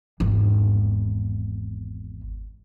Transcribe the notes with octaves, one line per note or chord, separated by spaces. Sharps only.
G#1 E2